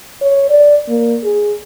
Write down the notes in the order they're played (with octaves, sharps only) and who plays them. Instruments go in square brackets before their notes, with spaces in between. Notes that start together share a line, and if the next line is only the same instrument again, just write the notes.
[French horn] C#5
D5
A#3
G#4